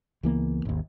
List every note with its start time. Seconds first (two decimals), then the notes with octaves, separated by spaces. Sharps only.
0.23 C#2 E3 A#3 B3
0.65 G#1 D#2